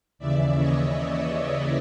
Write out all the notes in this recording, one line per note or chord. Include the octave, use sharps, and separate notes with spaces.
D#2 C#3 E3 D5 E5
C#5 D#5
D5 E5